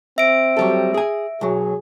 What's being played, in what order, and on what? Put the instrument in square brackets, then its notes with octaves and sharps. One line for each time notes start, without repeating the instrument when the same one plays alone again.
[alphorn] C4 [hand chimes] E5 D7
[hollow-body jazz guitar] F#3 G3 A4
G#4 G#5
[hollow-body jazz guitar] B1 F#3 [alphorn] G#4